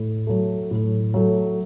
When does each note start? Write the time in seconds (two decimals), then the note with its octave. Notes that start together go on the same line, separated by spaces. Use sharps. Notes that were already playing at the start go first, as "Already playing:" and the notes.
Already playing: A2
0.27 F#3 A3
0.71 A2
1.14 F#3 A3